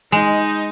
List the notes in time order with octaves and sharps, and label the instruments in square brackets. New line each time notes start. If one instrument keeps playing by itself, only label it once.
[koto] G#3 [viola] D#4